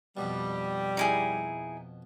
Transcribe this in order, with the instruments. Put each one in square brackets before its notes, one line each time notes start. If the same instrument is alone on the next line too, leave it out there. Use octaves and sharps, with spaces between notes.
[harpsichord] F2 B2 [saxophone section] G3
[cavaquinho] D#4 E4 G#4